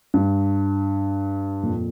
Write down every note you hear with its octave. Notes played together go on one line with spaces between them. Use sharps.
G2
F2 A#2